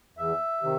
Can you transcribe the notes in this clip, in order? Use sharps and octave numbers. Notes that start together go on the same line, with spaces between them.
E2 E5
C3 D#3